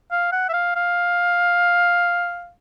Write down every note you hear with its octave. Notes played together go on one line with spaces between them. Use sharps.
F5
F#5
E5
F5
F5